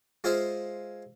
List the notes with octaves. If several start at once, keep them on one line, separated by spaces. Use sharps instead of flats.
G#3 F4 G#4 C5 E5 F5